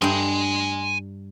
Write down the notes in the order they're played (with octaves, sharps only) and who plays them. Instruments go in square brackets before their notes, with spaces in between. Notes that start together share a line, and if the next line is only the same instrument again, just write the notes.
[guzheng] G2 G5 [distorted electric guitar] G#5 C6